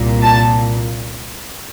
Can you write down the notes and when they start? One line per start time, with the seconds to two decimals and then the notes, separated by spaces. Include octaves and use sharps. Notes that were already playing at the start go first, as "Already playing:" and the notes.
Already playing: C2 A#2
0.22 A5